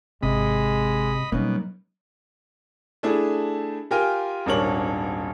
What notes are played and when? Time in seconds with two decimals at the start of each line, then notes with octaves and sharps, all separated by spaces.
0.23 G#1 C3 G#3 D#5 B5
1.32 B2 F#3 G3 A#3 C#4 D#4
3.03 A3 D4 E4 G#4
3.91 F4 G4 A#4 G5 G#5
4.46 D#1 G#1 D4 A#4 C#5 F#7